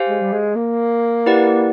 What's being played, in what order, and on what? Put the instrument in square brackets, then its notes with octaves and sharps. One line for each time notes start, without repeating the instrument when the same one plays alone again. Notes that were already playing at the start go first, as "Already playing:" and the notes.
Already playing: [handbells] G4 C5 F5 G#5
[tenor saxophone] G#3
G3
G#3
A#3
[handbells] E4 G4 B4 D5 F#5